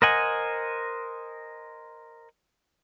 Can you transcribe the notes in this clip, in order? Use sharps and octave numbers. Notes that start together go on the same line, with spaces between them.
A#4 C5 D#5 F#5 G#5